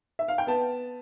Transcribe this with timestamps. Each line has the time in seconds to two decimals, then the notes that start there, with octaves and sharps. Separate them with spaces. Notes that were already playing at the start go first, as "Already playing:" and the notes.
0.19 E5
0.28 F5
0.38 G5
0.47 B3 A5